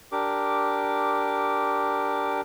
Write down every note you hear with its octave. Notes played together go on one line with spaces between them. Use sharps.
D4 G4 A#4 D6